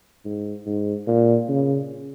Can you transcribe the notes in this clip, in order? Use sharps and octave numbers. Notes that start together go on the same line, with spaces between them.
G#2
G#2
A#2
C#3